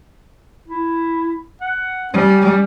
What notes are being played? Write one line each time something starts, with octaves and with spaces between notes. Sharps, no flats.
E4
F#5
G3 C#4